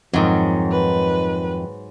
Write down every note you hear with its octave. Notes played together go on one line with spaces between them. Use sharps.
F2 G#2 D#3 F#3
B4